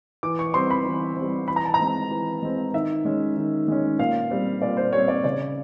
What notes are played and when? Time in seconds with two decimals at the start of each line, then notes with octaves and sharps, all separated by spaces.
0.23 E3 D6
0.39 C#6
0.54 G3 C4 C6
0.71 B5
0.86 E3
1.17 G3 C4
1.48 E3 B5
1.56 A#5
1.65 A5
1.74 A#5
1.79 G#3 C4
2.11 E3
2.42 G#3 C4
2.73 D#3 E5
3.05 G#3 C#4
3.37 D#3
3.68 G#3 C#4
3.99 A#2 F5
4.30 G3 C4
4.62 A#2 D5
4.77 C5
4.93 G3 C4 C#5
5.08 D5
5.24 C#3 D5